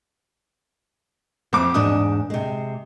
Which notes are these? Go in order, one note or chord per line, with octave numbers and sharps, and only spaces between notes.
F2 C4 D6
E2 G#2 D4 D#6
C3 G#3